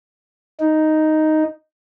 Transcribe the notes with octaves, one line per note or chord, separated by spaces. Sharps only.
D#4